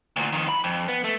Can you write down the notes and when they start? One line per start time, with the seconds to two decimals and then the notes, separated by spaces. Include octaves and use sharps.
0.16 D2 A#2
0.33 F2 D#3
0.49 B5
0.64 F2
0.88 B3
1.04 A3